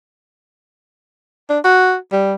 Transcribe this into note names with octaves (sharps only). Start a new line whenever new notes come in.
D4
F#4
G3